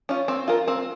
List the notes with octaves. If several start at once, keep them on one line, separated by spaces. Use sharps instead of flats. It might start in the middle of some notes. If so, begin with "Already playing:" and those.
C#4 F4
C4
F4 A#4
C4